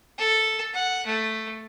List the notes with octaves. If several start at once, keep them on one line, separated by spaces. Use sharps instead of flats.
A4
F#5
A3